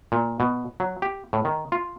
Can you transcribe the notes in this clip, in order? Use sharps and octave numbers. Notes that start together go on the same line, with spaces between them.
A#2
B2
F#3
G4
A2
D#3
F4